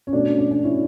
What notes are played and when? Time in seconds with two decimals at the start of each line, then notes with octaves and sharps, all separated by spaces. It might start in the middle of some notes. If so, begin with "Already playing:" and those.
0.07 C#4
0.13 B2 A3 D4
0.26 C#4
0.39 D4
0.51 D4
0.64 C#4 E4